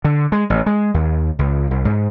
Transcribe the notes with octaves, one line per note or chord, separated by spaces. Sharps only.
D3
G#3
A1
G#3
D#2
C#2
C2
G#2